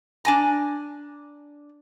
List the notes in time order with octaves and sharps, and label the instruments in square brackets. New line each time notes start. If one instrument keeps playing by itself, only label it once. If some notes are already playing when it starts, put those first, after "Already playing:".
[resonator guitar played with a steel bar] D4 G#5 A#5